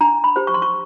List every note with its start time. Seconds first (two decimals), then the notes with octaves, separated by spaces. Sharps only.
0.01 D4 A#5
0.24 B5
0.36 G4 C5
0.47 C#6
0.54 C6
0.62 C#6